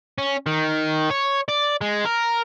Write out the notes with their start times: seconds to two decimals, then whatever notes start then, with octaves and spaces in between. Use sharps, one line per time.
0.18 C#4
0.47 D#3
1.10 C#5
1.49 D5
1.81 G#3
2.05 A#4